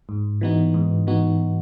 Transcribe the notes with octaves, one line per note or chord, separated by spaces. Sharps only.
G#2
E3 B3 D#4 F#4
G#2
E3 B3 D#4 F#4